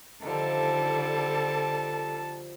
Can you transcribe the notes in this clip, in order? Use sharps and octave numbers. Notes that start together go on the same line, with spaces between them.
D3 D#3 F3 G3 A4 A5